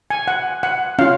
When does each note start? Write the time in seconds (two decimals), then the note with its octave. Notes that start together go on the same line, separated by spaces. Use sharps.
0.10 G#5
0.28 F#5
0.63 F#5
0.99 C#4 F4 F5